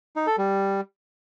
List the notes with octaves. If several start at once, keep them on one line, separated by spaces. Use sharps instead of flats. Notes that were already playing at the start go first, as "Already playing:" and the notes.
D#4
A4
G3